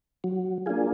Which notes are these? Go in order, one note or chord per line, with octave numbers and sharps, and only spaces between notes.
F#3
A#3 D4 F4 G#4